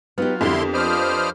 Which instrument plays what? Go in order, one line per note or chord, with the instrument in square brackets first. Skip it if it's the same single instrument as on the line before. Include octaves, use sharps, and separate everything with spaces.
[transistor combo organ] F#3 F4 [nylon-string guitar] B3 D#4 G4
[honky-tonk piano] F2 [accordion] D3 E4 C6 [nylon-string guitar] D4 G4 A#4
[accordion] F3 C5 F6 [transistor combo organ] B4 D5 D#5